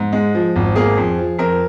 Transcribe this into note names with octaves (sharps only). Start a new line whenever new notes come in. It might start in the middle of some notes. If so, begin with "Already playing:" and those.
Already playing: G#2
G#3
F3
G#1
A#3 G#4
F2
F3
F2 A#4